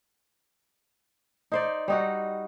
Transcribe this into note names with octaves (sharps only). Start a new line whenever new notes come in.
D#4 C5 D5
G3 D#4 F#4